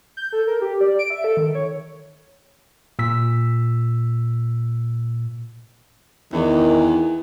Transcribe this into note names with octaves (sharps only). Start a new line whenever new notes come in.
G6
A4
A#4
G4
D5
D7
E5
A4
D#3
C#5
A#2 E6 B6
E2 D#3 E3